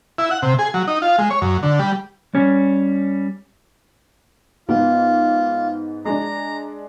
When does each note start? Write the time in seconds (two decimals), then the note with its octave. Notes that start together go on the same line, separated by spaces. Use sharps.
0.18 E4
0.31 F#5
0.42 C3
0.59 G#4
0.74 F#3
0.88 D#4
1.02 F4
1.18 G#3
1.30 C#5
1.42 F#2
1.63 D3
1.79 G3
2.35 G3 C#4 C#5
4.69 G#2 B3 F4
6.05 G#3 D4 A#5